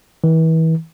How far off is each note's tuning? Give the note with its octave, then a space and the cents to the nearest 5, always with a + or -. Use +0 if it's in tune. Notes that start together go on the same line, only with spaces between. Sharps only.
E3 -35